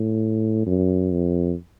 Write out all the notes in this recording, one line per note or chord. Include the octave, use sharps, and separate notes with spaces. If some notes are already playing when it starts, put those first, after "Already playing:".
Already playing: A2
F#2
F2